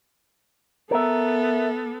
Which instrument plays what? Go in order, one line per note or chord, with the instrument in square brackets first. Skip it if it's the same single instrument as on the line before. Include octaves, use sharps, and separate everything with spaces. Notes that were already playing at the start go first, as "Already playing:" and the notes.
[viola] B3 A4 [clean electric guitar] A#4 E5